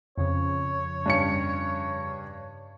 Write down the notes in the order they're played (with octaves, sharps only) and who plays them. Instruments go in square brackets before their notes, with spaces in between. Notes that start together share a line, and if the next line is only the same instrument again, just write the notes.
[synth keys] F2 C#3 [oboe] C#5
[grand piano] G2 C#4 C#7